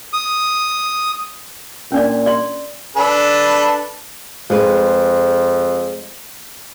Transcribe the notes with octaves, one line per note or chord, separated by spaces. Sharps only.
D#6
A#2 C#4 D4 D5
D5 C6
D4 A4 B4
F2 G#3 B4